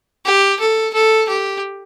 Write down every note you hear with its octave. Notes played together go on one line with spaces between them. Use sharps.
G4
A4
A4
G4